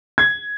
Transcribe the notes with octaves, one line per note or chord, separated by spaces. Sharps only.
G#6